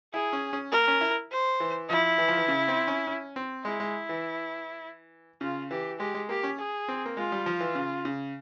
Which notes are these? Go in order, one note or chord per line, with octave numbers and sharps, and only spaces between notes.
E4 G#4
C#4
C#4
A#3 A#4
C#4
E4
C5
E3
F3 E4
E3
F3
E3
C#3
C4
C#4
C#4
C4
G#3 E4
G#3
E3
C#3 F4
E3 G4
G#3 G4
G#3
A#3 G4
C#4
G#4
C4
A#3
G#3 F4
G3
F3
E3
C#3
C#3